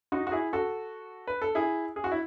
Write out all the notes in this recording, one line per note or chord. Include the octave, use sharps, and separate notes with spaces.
D#4 F#4
F#4
E4 G#4
F#4 A4
B4
A4
E4 G#4
G#4
F#4
E4